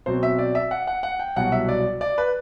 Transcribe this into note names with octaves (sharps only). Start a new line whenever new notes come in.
B2 F#3 C4 C5
E5
D5
E5
F#5
F#5
F#5
G5
C2 B2 F#3 F#5
E5
D5
D5
B4